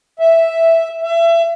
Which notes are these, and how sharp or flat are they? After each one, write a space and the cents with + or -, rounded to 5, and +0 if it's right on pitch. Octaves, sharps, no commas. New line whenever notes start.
E5 +0
E5 +30